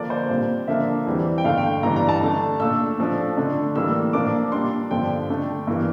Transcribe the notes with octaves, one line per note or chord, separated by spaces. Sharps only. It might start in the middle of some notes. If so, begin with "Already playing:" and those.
Already playing: D3 F3 A#3 D4 D5
C5
A#2 G3 C4
D3 F3 A#3 D4 E5
E2 E3 G3 C4
G5
G2 D3 A3 F5
G5
G2 E3 G3 D4 A#5
A#5
A5
D3 A3 D4
A#2 A3 D4 E6
A2 F3 A3 D4
D3 A3 D4
A2 E3 G3 A#3 E6
A#2 F3 A#3 D4 D6
A#2 G3 D4 C6
G2 D3 F3 G5
D3 A3 D4
G2 E3 A#3